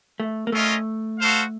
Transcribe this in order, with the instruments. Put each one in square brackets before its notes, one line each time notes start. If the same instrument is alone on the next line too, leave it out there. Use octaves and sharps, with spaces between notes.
[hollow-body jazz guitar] A3
A#3
[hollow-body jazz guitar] A3 [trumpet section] C#4 F4 A#4 D#5
[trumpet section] F#4 A4 C5 F5